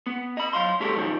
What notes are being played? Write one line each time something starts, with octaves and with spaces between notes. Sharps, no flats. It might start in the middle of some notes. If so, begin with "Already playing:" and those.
B3
D#5 B5
F#3 F5 C6
C#2 G#3 G4 A4 C#5
B1 B2 D#3 F3 G3